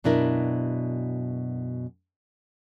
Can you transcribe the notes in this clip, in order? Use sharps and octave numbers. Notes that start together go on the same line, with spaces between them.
F#2 B2 D4 E4 A#4